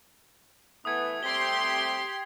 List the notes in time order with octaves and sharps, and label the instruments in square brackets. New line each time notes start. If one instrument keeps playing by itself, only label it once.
[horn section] E3 A3 B3 [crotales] D#6 G#6
[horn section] G3 A3 C4 [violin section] G4 C6 [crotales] B6 G7